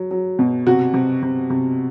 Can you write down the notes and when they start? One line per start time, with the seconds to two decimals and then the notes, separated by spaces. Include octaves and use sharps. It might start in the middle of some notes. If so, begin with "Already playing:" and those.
Already playing: F#3
0.11 F#3
0.39 B2
0.67 C3 F#4
0.94 C3
1.22 C3
1.50 C3